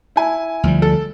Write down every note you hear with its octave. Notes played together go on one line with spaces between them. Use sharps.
E4 G#5
D2 F3 G3
A4